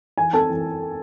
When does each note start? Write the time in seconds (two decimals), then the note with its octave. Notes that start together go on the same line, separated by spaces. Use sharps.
0.18 E3 G#5
0.33 C4 A4 A5
0.49 E3